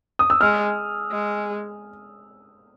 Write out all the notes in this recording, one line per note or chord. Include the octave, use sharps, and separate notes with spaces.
D#6
E6
G#3 F6
G#3